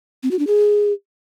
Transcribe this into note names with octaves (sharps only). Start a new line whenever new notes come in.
C4
F#4
D4
G#4